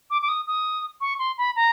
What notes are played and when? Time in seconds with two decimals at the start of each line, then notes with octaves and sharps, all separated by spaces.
0.10 D6
0.22 D6
0.29 D#6
0.47 D#6
1.01 C#6
1.19 C6
1.38 B5
1.56 A#5